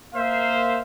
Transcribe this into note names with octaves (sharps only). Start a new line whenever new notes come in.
A#3 C5 E5 F5